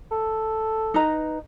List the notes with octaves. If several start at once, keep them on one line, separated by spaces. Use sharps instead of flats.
A4
D#4 B4 A#5